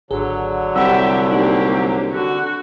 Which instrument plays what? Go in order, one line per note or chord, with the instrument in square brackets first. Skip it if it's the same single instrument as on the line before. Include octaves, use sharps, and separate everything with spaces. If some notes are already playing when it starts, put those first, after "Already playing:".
[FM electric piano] G#1 G#4 [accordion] D3 F#3
[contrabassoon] C2 [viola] G4 E5 [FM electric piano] F#5 B5 E6
[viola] A#3 G4 [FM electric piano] D#4
[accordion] D3 [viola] F#4